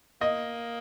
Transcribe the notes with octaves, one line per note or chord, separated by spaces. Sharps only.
A#3 D#5